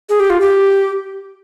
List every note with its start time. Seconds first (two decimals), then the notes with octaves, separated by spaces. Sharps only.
0.09 G#4
0.20 G4
0.30 F4
0.40 G4